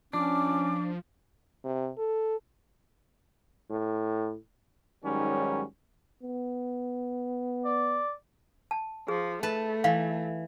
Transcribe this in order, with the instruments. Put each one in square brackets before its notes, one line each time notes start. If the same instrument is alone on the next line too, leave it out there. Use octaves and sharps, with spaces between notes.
[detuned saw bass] F3 [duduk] C#4 [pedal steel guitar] D4 [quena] D6
[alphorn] C3
A4
[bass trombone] A2
[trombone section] G#2 D#3 F#3 G3 C#4
[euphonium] B3
[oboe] D5
[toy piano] A5
[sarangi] F3 [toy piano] G#4
[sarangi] A3 [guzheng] B4 A5
[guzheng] E3 [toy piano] F5